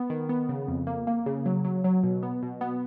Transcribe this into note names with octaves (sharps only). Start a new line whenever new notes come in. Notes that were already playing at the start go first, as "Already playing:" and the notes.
Already playing: B3
D#3
B3
C#3
F2
A#3
A#3
C#3
F#3
F#3
F#3
B2
B3
B2
B3